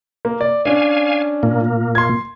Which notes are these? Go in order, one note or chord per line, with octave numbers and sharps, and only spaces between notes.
A#3
D5
C#4 D4 F5 G#5
A#2 A#3
C6 G#6